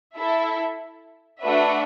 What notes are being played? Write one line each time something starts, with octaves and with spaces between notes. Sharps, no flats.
E4 A4 E5
A3 D4 F#4 B4 E5